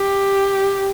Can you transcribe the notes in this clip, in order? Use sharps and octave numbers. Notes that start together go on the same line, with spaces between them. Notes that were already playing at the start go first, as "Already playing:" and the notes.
Already playing: G4